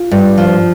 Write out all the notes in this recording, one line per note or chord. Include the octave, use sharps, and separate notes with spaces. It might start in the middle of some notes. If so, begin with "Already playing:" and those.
Already playing: F4
G2
F3